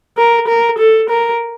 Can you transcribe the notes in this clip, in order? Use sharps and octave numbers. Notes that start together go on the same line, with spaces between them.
A#4
A#4
A4
A#4